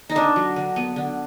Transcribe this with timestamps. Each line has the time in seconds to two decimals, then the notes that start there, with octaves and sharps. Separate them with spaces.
0.10 D#4
0.15 D3 D4
0.36 F#3
0.56 D3
0.76 B3
0.96 D3